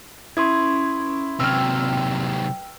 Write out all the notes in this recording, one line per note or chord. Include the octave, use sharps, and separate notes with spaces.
C#4 E4 B4 C6 C#6 D#6 G#6
C3 F#3 B4 G5 E6 F6